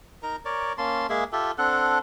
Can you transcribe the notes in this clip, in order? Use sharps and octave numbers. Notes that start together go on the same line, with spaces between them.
D#4 A#4 A#5
A#4 C#5 D5
A#3 C#4 A5 C6
G#3 A#3 G#4 E5
F4 G4 A4 E5
C4 D4 A4 F#5